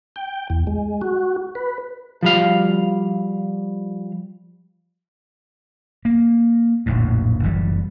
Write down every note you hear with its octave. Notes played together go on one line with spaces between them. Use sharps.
G5
E2
G#3
F#4
B4
F3 G3 F5
A#3
D1 A#1 F2 A2
F#1 E3 G3